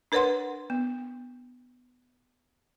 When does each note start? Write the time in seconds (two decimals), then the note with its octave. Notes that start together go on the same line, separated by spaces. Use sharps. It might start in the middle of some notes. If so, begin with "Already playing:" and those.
0.12 D4 A#4 B4 C#5 F#5 C6
0.70 B3